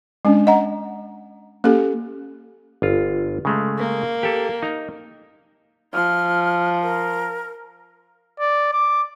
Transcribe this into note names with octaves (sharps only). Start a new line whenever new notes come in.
G#3 C#4 D4
D#5 F#5 A#5
A#3 C#4 G4 A4
G1 F4
C#3 G#3 A3
A#3
G4 A4
D#4 A#5
F3 F6
A#4
D5
D6